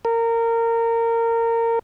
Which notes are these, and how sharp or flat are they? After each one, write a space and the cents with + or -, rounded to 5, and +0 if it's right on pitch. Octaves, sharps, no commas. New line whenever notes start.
A#4 -20